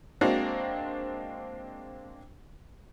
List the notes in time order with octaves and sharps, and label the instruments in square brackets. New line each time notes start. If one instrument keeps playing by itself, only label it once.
[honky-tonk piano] G#3 A#3 C4 D4 F#4